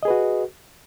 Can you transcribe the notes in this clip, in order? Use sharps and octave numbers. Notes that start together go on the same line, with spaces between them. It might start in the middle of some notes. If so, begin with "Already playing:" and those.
F#4 G#4 B4 D#5